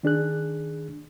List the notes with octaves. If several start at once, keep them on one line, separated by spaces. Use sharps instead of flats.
D#3 D4 G#4 F#6